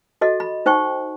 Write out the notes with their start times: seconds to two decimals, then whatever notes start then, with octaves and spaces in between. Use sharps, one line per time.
0.21 F#4 A4 D#5
0.40 B5
0.66 D#4 C5 G5 C#6